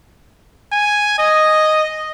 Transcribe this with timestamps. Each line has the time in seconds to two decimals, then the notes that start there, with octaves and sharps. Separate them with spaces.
0.72 G#5
1.19 D#5